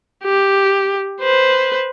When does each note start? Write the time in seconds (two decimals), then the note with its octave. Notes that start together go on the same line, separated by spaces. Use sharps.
0.24 G4
1.21 B4 C5